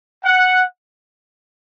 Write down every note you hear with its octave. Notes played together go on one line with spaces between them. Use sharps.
F#5